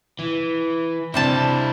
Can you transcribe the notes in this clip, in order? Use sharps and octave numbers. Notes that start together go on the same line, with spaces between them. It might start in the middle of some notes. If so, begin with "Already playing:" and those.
E3
C3 G3 D4 E4 A5